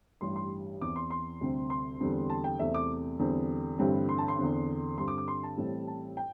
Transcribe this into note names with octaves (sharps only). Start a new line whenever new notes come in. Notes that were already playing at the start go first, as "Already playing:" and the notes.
A1 G2 G3 C6
C6
E2 E3 C4 D6
C6
C6
D2 C3 G3 C4
C6
E2 D3 G3 C4
A5
G5
E2 C3 A3 C4 E5
D6
E2 D3 G3 C4
A1 G2 D3 G3 C4
C6
A5
C6
E2 D3 C4
G2 D3 C4 C6
D6
D6
C6
A5
A1 A2 G3 C4
A5
G5